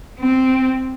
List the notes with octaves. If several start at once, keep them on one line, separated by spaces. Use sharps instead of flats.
C4